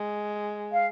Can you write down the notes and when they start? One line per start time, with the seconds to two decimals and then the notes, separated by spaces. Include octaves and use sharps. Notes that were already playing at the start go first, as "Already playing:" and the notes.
Already playing: G#3
0.72 F5